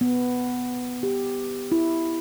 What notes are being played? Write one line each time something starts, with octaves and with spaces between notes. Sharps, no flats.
B3
G4
E4